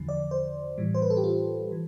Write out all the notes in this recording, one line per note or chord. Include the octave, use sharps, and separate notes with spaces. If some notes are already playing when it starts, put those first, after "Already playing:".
Already playing: E2 D3 F3
D5
C5
A2 E3 G3
C5
B4
A4
G4
F4
E3